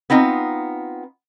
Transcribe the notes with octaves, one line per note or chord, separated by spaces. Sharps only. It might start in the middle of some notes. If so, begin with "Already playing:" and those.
B3 C4 D#4 F4